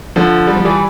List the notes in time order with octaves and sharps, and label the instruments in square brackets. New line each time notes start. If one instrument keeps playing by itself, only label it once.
[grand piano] D3 F3
G3
F3
E3 G3